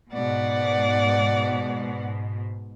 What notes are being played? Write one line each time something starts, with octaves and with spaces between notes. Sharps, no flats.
G#2 B2 D5 F#5